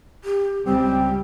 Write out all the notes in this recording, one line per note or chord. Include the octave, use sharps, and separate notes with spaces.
G4
C#2 G3 C4 G5